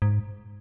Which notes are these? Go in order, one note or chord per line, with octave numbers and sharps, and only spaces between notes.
G#2